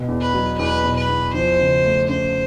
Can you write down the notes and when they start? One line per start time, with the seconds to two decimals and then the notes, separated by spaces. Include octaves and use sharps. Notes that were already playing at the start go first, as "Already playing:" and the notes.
Already playing: B2
0.08 E2
0.21 B4
0.34 F#3
0.59 E2 B4
0.84 B2
0.97 B4
1.09 E2
1.34 F3 C5
1.59 C#3
1.84 A3
2.08 C#4 C5